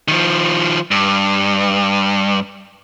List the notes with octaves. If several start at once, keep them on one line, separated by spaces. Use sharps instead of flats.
D#3 F3
G2